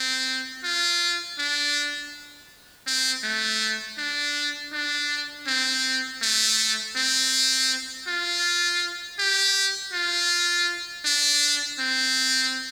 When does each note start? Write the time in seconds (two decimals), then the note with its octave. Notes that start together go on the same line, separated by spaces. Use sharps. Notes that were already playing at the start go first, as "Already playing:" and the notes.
Already playing: C4
0.64 F4
1.38 D4
2.87 C4
3.24 A3
3.98 D4
4.73 D4
5.47 C4
6.22 A3
6.96 C4
8.07 F4
9.19 G4
9.93 F4
11.05 D4
11.79 C4